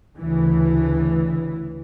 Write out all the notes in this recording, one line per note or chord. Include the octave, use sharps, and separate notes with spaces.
D2 C#3 E3